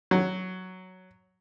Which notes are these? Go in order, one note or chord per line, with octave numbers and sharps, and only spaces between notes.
F#3